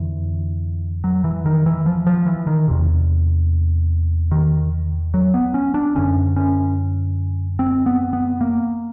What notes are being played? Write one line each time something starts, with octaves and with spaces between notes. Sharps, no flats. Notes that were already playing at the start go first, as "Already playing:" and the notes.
Already playing: F2 D3 E3
F#3
E3
D#3
E3
F3
F3
E3
D#3
E2 C3
D#3
F#3
B3
C#4
D4
F#2 D3 C#4
C#4
C4
B3
B3
A#3